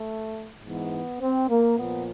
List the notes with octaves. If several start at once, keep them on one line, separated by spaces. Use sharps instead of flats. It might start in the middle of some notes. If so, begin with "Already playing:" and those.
Already playing: A3
G#2 E3 B3
C4
A#3
A#2 F3 B3